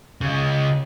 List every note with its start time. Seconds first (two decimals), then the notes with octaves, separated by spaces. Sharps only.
0.21 C#3 G#3